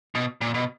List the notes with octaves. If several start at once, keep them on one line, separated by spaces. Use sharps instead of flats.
B2
A#2
B2